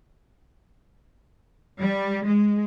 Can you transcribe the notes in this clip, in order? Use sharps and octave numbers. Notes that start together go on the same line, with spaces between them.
G3
G#3